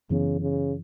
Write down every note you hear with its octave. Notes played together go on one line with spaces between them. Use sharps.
F#2 C#3 E3 B3
C#3